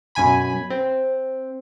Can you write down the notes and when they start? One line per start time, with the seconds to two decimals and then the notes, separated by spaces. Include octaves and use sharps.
0.15 F#2 B2 G#5 B5
0.70 C4